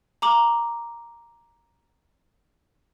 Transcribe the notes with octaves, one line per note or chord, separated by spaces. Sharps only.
A#5 D6 F#7